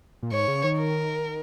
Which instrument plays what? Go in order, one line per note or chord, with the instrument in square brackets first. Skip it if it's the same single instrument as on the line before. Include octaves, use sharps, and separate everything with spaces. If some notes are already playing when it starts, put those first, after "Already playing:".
[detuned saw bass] A#2
[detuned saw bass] G#2 [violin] C#5
[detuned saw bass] C#3
D#3
[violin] A#4